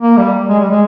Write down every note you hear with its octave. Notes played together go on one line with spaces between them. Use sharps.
A#3
G3
G#3
G3
G#3